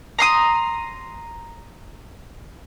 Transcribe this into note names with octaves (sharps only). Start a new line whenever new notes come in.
A#5 C6 D#6